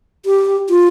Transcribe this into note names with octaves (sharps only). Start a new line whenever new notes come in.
G4
F4